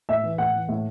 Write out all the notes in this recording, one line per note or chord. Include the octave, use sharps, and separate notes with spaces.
A2 E5
E3
A2 F#5
E3
A2